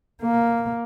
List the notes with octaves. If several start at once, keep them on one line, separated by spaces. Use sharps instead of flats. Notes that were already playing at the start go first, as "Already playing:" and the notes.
A#3